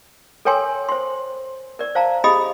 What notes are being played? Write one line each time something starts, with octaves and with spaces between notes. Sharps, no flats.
A4 A#4 C#5 G5 G#5 C6
C5 C6
A#4 D5
C5 F5 A5 A#5
G4 G#4 D#5 B5 D#6